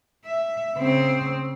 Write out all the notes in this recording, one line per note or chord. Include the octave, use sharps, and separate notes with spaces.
E5
C#3 C4